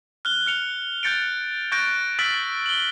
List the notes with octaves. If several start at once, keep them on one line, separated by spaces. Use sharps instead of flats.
F6 F#6 G7
F6 C#7 F7
F#6 G6 A6 C#7 D7
C#6 F#6 G6 A6 A#6 D7
E6 F6 A6 B6 D7 F#7
F#7 G7